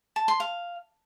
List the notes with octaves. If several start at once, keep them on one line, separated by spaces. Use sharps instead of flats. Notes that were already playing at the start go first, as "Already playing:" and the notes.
A5
C6
F5